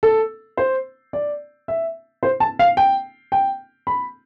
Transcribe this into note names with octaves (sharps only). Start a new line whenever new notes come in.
A4
C5
D5
E5
C5
A5
F5
G5
G5
B5